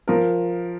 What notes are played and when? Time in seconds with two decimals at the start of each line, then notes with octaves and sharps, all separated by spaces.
0.08 F3 A#4